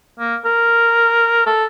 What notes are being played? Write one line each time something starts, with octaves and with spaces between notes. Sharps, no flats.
A#3
A#4
A4